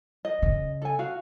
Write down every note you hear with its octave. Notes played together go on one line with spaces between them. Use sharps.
D#5
C#3
A4 G#5
F#4 F5